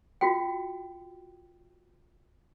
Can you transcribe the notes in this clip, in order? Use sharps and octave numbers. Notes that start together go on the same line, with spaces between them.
F4 F#4 G5